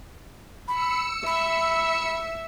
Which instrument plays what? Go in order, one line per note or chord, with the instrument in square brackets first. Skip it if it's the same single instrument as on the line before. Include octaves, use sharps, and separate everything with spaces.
[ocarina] B5 [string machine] E6 C#7
[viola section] E5 [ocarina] B5